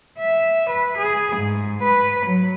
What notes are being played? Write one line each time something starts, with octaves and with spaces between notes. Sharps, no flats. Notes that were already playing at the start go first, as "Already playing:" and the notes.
E5
B4
G#4
G#2
B4
F#3